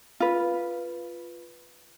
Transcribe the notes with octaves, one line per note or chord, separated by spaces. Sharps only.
F4 B4